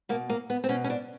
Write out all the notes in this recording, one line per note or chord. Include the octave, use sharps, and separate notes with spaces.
B2 A#3
A#3
B3
C4
B2 C#4
C#4
D4